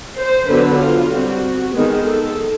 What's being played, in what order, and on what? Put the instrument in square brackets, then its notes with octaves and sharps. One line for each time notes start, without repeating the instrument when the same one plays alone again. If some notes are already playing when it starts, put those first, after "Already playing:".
[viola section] C5
D3 F#3 B3 B4
F4
G3 C4 F#4
D#3 G#3 B3 G#4
A4